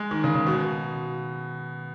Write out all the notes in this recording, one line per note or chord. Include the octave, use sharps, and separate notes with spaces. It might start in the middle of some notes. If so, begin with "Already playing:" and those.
Already playing: G#3
D#3
C#3
C#3
B2